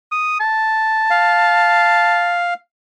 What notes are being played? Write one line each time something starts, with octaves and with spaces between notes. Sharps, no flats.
D#6
A5
F5